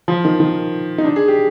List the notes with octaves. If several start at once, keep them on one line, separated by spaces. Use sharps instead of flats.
F3
D#3
D#3
D#4
D4
G#4
G4